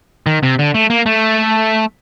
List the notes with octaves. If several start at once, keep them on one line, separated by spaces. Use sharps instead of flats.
D#3
C3
D3
A3
A#3
A3